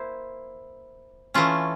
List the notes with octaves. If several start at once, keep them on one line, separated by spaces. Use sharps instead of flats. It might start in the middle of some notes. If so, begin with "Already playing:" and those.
Already playing: A#3 E4 C5
E3 A3 C#4 F4